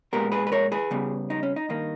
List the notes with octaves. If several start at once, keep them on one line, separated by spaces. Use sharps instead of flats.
A#2 G#3 B3 G4 A#4
G#4 B4
B4
A#4 C#5
G#4 B4
C#3 G3 B3
D#4
C#4
D#4
G2 D#3 A#3 D#4